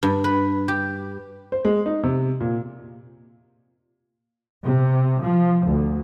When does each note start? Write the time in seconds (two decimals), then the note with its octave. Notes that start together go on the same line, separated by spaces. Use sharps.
0.03 G2
0.24 B4
0.68 G4
1.52 C5
1.65 G#3
1.86 D#4
2.03 C3
2.40 A#2
4.64 C3
5.21 F3
5.66 D2